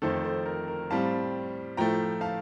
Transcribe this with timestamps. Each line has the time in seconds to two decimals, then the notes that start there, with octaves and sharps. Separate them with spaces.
0.02 F2 D#3 A3 A4 C5
0.24 A4 C5
0.46 A#4
0.68 A#4
0.91 A2 G3 C4 F5 A5
1.77 A2 F3 A3 G5 A#5
2.21 F5 A5